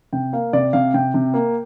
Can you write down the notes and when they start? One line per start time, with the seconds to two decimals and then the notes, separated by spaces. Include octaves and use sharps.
0.13 C3 G5
0.33 A#3 F5
0.53 C3 D5
0.73 C3 F5
0.94 C3 G5
1.14 C3
1.34 A#3